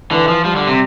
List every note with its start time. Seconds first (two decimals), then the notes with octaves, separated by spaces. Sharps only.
0.11 D3 E3
0.28 F3
0.45 F3 G3
0.56 D3
0.67 C3